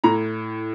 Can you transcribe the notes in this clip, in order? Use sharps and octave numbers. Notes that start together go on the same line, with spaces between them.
A2 A#5